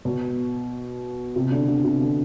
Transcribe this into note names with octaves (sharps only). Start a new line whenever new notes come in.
B2
C3
D3
D3
C3
D3